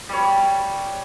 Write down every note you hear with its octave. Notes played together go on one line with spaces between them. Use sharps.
G3 C#5